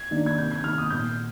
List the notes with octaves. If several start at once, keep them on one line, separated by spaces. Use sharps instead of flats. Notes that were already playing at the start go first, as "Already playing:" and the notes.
Already playing: G#6
D#3 A#3 D4
G#6
C3 G6
G#6
D#3 A#3 F6
D#6
A#2 G6